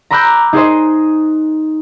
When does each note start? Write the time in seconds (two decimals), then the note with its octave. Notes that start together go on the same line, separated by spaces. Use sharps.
0.11 A#5 B5 D6 E6 F#6 G6
0.53 D#4 G#4 C5 D#5